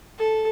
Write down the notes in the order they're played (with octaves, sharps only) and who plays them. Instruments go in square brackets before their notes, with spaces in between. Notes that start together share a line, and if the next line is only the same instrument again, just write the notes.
[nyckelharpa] A4